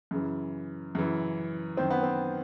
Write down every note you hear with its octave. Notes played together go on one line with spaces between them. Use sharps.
F#2 C#3 E3
F#2 C#3 E3
F#2 D#3 C4
B3
C4